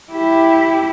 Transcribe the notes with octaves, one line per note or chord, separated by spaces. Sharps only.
E4 G4